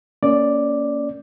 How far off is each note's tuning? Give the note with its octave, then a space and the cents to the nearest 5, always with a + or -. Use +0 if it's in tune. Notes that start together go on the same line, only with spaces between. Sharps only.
A#3 +0 C#4 +20 D5 +0